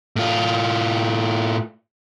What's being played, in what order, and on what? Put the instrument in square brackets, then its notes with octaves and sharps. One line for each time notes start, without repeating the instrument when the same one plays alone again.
[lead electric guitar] A2 F4